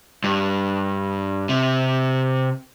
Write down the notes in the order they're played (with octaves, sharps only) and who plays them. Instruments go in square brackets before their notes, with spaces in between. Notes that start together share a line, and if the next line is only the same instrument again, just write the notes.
[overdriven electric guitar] G2
C3